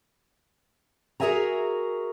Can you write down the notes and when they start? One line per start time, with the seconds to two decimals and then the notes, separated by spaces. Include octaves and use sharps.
1.20 F#4 G#4 A#4 E5 G#5 A#5